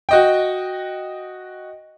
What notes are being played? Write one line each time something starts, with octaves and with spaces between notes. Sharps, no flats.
F#4 D#5 G5